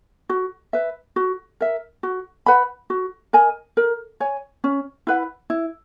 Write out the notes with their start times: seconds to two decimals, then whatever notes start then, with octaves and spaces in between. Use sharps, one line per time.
0.30 F#4
0.73 B4 E5
1.16 F#4
1.61 A#4 E5
2.03 F#4
2.46 B4 F#5 B5
2.90 F#4
3.33 A#4 D#5 G#5
3.77 A#4
4.20 C#5 G#5
4.64 C#4
5.07 E4 B4 F#5
5.50 E4